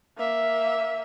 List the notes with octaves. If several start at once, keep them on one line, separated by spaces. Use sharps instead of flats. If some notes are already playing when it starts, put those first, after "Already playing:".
A#3 E5